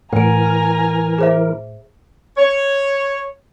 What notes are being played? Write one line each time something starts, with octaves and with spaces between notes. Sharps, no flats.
A2 E3 A#4 F#5 G#5 A#5 D7
G#4 C5 E5
C#5